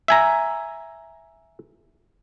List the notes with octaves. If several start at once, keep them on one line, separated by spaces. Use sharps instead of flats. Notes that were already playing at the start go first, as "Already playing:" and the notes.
E5 G#5 A#5